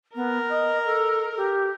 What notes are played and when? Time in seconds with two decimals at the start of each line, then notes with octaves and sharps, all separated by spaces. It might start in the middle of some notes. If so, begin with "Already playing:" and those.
0.15 B3 A#4
0.49 D#5
0.85 A4
1.36 G4